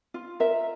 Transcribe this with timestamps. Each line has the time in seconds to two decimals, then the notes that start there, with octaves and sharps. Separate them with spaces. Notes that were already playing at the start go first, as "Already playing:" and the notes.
0.14 F4
0.40 A#4 E5